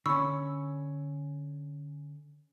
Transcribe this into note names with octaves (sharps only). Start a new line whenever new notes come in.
D3 C#4 B5 C#6 E6